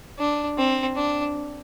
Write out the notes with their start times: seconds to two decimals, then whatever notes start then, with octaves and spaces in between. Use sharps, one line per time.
0.19 D4
0.57 C4
0.96 D4